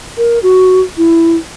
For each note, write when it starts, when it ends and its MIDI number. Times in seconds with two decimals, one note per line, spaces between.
0.17 0.39 70
0.43 0.81 66
0.97 1.36 64